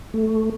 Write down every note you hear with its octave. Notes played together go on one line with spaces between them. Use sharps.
A3